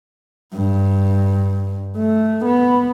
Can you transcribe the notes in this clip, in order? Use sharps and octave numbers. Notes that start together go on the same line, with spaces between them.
G2
A3
B3